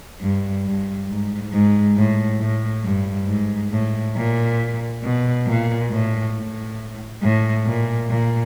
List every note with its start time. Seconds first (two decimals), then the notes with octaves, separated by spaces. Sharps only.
0.22 G2
0.65 G2
1.09 G#2
1.52 G#2
1.97 A2
2.40 A2
2.84 G2
3.28 G#2
3.72 A2
4.16 A#2
5.03 B2
5.47 A#2
5.91 A2
6.36 A2
7.23 A2
7.66 A#2
8.11 A#2